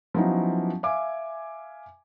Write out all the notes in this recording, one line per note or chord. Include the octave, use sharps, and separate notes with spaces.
F3 F#3 B3 C#4 D#4 E4
E5 F5 G#5 D6